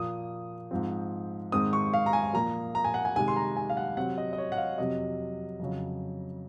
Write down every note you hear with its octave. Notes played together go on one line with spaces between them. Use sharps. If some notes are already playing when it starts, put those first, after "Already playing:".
Already playing: A#2 F3 A#3 D#6
G#2 F3 C4
G#2 D#3 G#3 C4 D#6
C#6
F5
A#5
G#5
A#2 F3 A#3 A#5
A#5
G#5
F#5
G#5
C3 D#3 G#3 G#5
C6
A#5
G#5
F5
F#5
C3 F#3 C4 F#5
D#5
D#5
C#5
F#5
F5
F2 C3 F#3 C4 D#5
F2 C#3 F#3